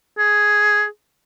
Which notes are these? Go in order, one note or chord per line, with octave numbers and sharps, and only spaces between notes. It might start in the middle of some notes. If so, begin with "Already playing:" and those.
G#4